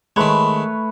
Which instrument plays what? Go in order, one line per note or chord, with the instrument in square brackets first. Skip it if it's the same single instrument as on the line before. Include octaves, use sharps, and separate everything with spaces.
[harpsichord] D#3 G#3 [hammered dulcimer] A3 B4 C#5